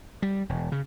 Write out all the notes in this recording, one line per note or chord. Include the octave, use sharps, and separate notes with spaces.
G3
E1
C#3